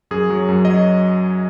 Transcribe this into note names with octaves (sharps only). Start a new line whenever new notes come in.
F#2 G#4
F#3
F#2
D#5
F#3